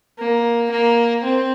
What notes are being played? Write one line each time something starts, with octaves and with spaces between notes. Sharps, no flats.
A#3
A#3
C4